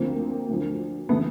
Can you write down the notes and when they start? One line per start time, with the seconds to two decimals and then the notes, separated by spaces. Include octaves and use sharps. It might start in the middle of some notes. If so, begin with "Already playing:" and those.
Already playing: D2 D3 F3 A#3 C4
0.49 D2 D3 F3
1.09 C#3 E3 A3 B3